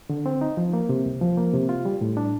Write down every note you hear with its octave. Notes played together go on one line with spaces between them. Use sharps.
D3
C4
D#4
F3
A#3
C3
C2
F3
A#3
C3
F4
G3
A2
D4